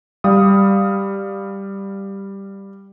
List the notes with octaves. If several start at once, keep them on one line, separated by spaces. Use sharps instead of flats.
G3 F5 D#6